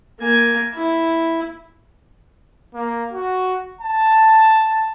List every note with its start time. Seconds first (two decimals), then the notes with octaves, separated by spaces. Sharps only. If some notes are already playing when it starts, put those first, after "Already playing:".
0.19 A#3 G#5
0.74 E4
2.74 A#3
3.12 F#4
3.81 A5